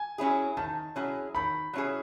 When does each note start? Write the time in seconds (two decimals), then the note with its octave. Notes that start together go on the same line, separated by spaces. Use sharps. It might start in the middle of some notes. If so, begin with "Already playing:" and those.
Already playing: G#5
0.18 F#3 C#4 E4 G#4
0.57 D#3 A5
0.96 F#3 C#4 E4 G#4
1.35 D#3 B5
1.73 F#3 C#4 E4 G#4